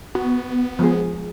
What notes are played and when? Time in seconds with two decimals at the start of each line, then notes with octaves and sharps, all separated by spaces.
0.15 B3 F#4
0.79 F3 G#3 G#4